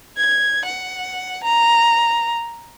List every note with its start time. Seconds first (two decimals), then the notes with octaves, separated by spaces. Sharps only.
0.17 G#6
0.64 F#5
1.43 A#5